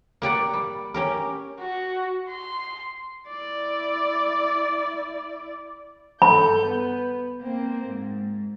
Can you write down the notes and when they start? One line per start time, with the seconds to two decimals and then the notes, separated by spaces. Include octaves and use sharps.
0.22 A#3 G4 D5 F#5
0.53 G3
0.94 C#4 G4 A#4
1.60 F#4
2.29 C6
3.29 E4 D5
6.22 G2 A4 B5 G6
6.64 B3
7.40 A#3 C4
7.87 G#2